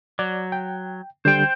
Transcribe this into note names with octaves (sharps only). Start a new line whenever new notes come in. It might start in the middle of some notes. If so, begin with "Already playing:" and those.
F#3 D5
G5
D3 G3 C5 G5